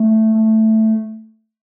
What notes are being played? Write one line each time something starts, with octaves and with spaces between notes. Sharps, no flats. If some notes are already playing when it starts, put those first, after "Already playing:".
Already playing: A3
A3